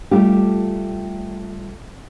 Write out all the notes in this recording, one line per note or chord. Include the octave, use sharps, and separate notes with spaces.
G3 A3 F4 G4